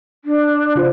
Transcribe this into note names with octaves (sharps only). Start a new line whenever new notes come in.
D4
C#3 F4 C5